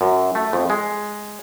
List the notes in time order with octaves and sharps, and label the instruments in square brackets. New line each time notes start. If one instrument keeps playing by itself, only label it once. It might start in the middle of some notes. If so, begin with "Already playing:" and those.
[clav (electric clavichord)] F#2
A3
F2
G#3